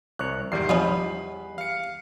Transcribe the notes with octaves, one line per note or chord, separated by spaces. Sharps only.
C2 C#5 F#6
E2 G#2 D#3 G3 C7
F3 C#4 D#4 B5
F5 C#7